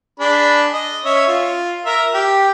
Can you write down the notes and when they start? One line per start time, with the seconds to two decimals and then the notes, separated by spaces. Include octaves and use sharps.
0.20 D4 G#4 B5
0.73 D#5
1.05 C#4 C#5 E5
1.28 F4
1.86 A#4 E5
2.14 G4